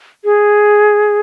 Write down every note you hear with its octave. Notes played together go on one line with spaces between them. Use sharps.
G#4